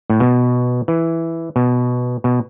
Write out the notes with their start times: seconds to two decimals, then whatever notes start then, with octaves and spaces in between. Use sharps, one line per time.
0.10 A2
0.20 B2
0.88 E3
1.56 B2
2.24 B2